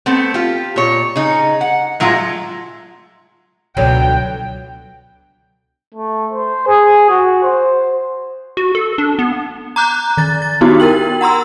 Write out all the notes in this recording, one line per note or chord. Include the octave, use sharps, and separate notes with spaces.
A3 B3 C4
F4 G4
A#2 C#5
C#3 D#4
F#5
A2 F#3 G#3 E4 F4
C#2 B2 D3 F#3 B3 G5
A3
C5
G#4
F#4
C5
F#4
A4
D4
B3
A#5 D6 F#6 G6
D#3 A6
A6
B3 D#4 E4 F#4 G4
A#4 G5 F#7
F#5 A#5 C6 E6